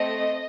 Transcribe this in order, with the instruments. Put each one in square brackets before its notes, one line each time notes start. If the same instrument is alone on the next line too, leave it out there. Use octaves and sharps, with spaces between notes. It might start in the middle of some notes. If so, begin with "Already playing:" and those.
Already playing: [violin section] A3 C4 D#5